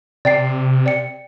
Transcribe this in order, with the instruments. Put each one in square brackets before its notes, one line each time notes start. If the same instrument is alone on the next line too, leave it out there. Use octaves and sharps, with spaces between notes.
[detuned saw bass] C3 [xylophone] D5 G5 C7
[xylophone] D5 G5 C#7